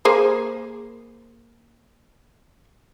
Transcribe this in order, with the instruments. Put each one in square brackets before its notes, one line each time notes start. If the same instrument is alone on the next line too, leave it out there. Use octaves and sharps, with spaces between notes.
[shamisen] A#3 G#4 C5